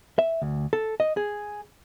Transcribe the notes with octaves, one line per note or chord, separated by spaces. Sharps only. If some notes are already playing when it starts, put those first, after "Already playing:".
E5
D2
A4
D#5
G#4